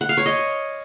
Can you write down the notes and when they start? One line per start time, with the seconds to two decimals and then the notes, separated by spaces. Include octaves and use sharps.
0.01 F#5
0.09 F5
0.17 C#5
0.26 D#5